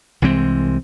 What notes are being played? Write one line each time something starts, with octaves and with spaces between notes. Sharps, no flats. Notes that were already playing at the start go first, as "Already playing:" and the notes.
C2 E3 G#3 C4